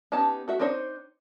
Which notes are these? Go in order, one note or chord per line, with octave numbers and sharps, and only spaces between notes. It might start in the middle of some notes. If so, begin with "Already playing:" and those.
B3 C#4 D#4 G4 A5
A3 F#4 E5
C4 D4 D#4 C5 C#5